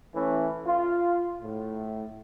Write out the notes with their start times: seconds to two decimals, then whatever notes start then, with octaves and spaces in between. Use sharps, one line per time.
0.15 E3 A3 C#4
0.67 F4
1.42 A2